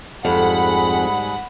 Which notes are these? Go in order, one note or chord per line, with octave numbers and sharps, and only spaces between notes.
F2 G#2 G3 G#4 F#5 B5